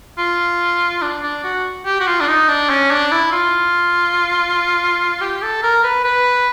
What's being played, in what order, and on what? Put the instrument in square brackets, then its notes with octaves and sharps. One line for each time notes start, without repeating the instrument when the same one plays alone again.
[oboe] F4
D4
D4
F#4
G4
F#4
F4
D4
D#4
D4
C#4
D4
E4
F4
G4
A4
A#4
B4
B4